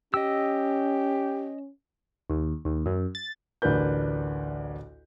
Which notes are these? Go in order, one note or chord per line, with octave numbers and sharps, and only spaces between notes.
C#4 G4 D#5 E6
D#2
D#2
F#2
A6
A1 D2 D4 A#4 B4 G6